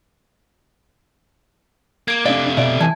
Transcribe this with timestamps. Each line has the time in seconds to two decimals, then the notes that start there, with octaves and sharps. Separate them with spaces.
2.08 A#3 G#6 D7
2.26 C3 A3 D4 D5 F5
2.57 B2 D5 E5
2.81 E3 G#5 A5 G#6